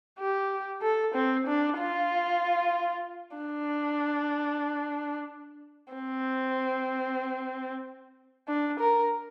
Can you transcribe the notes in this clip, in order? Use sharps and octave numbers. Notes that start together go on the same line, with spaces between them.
G4
A4
C4
D4
F4
D4
C4
D4
A#4